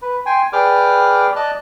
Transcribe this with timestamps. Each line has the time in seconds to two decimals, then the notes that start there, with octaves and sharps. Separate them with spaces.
0.02 B4
0.26 G5 G#5 C6
0.53 G#4 B4 D5 G5 D6 F6
1.36 D5 D#5 A5 F#6